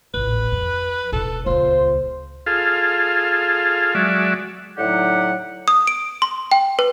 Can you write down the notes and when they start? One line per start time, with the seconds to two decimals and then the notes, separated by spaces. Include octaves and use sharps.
0.14 D#1 A1 B4
0.52 F2
1.12 E1 D#4 A4
1.46 D#1 C#2 F4 C5
2.46 F4 G#4 A4 F5
3.95 F#3 G#3 F#4 D5 E5
4.77 A2 D3 F#3 D#4 G4 F#5
5.68 D#6
5.87 D7
6.22 C6
6.52 G5
6.79 B4